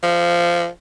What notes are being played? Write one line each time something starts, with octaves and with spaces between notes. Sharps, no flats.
F3